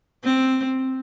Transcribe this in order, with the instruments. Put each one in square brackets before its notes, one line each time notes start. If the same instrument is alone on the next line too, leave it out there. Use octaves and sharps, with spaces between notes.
[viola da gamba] C4